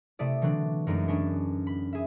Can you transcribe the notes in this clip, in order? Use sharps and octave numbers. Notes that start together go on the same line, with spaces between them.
C3 A3 E4 D5 D#6
D3 E3 F#3 C4 D4
F#2 G#3 A3 D4 D#4
B3 C#4 D4 G#4
B5
G#4 E5